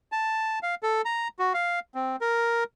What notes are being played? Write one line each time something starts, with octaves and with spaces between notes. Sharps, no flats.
A5
F5
A4
A#5
F#4
F5
C4
A#4